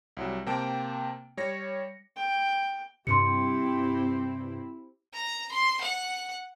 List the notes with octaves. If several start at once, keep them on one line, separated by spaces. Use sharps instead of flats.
C2 F#3 G3
C3 A#3 G5 A5 D7
G3 C#5 A#6 C#7
G5
G2 C3 C4 E4 G4 C6 C#7
A#5
C6
F#5